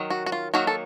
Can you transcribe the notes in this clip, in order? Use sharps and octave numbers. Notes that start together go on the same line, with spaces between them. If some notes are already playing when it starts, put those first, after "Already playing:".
Already playing: D#3 F#3
F#4
F#4
F4
D#3 F#3 A#3 F#4
A4